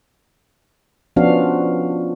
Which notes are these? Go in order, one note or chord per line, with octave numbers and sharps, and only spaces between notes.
F3 B3 C#4 D4 F#4 F5